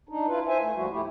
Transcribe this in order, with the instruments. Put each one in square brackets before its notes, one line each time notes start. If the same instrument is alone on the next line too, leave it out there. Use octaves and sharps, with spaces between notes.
[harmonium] D4 D#4
E4 F4 B4
C5 E5 G#5
A3
D#2 F3 G3 F#4
A2 A3 E4 G4